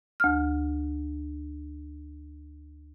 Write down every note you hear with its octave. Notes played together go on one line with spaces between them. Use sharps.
D2 F6